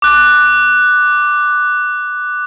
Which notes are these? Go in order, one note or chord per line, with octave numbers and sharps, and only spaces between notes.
D6 F#6